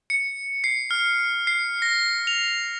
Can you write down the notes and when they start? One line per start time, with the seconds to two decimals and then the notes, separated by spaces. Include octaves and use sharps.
0.10 C#7
0.64 C7
0.91 F6
1.47 C7
1.82 A#6
2.27 F7